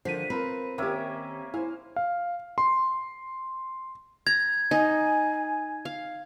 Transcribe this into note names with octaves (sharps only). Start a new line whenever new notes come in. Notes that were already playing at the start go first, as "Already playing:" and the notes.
D3 D#3 F3 F4 C5 B6 D#7
C4 F4 A#4 B4
D#3 A#3 C#4 G4 C#5 E5
E4 C5 F5 G#5
F5
C6
A#5 G#6
D#4 G#5
F5